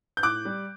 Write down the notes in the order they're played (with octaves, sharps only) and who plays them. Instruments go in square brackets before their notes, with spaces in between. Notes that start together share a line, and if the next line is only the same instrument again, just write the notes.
[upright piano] G6
A2 D6 F#6
G3